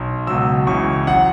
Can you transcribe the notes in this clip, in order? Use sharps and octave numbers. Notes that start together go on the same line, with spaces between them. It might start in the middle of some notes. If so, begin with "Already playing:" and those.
Already playing: B1
C#2 B2 F#3 E6
C#2 C#3 E3 C#6
A1 F#3 F#5